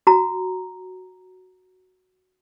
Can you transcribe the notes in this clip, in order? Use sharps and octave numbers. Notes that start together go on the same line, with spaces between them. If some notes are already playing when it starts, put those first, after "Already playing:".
F#4 A#5